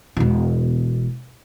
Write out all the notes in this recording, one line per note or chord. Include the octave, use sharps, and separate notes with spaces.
E1 B2